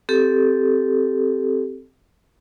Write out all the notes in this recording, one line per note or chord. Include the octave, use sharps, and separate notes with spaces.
C4 G4 A4